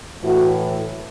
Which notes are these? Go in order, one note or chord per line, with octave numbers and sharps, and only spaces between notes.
A2 E3 F#4